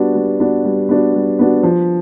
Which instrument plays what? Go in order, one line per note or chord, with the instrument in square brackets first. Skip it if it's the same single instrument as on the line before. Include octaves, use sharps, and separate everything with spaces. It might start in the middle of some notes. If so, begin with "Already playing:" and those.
Already playing: [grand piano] G3 B3 D4 F#4
G3
B3 D4 F#4
G3
B3 D4 F#4
G3
B3 D4 F#4
F3